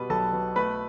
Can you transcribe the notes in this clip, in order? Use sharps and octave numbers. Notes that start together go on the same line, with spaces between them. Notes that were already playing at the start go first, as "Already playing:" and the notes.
Already playing: B2 G3 B4
B1 A4 A5
B2
A3 B4 B5